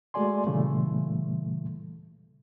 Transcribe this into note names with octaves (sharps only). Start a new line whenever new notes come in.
G#3 A3 F#4 D5 G#5 C6
A#2 C#3 E3 G3 A3